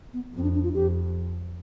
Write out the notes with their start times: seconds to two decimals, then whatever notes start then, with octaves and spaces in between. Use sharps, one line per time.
0.13 B3
0.34 F2 C4
0.43 D4
0.54 D4
0.63 F4
0.74 F2 G4